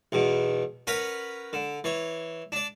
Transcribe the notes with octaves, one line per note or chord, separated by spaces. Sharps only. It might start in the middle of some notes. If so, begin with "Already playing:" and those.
B1 E2 B2
C#4 A#4 B4 F#5 B5
D3
E3 C#5
D4 D5